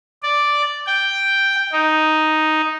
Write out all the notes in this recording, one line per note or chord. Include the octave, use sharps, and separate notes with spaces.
D5
G5
D#4